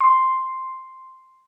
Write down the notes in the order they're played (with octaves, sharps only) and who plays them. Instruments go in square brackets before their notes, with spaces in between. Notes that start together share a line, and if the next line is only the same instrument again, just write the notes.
[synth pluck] C6